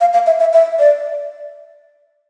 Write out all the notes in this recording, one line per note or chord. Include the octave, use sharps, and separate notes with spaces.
F5
F5
E5
E5
E5
D5